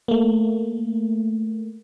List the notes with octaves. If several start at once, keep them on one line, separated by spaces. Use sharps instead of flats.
A3 A#3